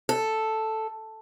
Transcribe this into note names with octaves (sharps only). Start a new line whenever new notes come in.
A4